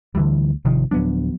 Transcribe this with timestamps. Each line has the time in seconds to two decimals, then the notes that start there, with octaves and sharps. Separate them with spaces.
0.15 D2 D3 E3 G3
0.65 G#1 C3 D#3 F3
0.91 D1 F3 F#3 B3 D4